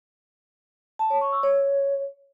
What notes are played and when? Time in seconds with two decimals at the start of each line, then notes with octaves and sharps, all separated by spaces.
0.99 A5
1.10 C#5
1.21 C#6
1.32 E6
1.43 C#5